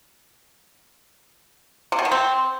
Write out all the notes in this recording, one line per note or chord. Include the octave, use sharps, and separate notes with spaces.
C3
B2
D#3
C4